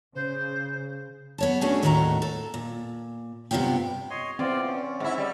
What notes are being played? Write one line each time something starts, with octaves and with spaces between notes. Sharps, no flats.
C#3 C5
B3 C#5 A5
A3 C#4 D4 F#4 G#4
D#2 A2 A3 F#4 D#5 A#5
A4
A#2
G2 C3 G#3 B3 F4 G5
C#5 D#5 C6
E2 C4 F4 D5
C#4
G#2 E4
G3